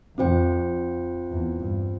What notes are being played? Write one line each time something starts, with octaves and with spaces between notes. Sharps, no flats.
F2 C4 F4 C5 G5
E2
G2